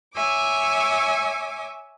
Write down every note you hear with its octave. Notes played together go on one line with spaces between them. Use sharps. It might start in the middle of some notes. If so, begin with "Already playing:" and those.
C#5 E5 G#5 D6